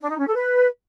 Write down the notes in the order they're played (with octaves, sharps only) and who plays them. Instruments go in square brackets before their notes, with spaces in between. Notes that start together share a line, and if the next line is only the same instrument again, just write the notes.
[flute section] D4
D#4
C#4
A4
B4